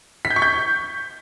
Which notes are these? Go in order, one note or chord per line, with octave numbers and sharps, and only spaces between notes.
B6
G6
C#6
G6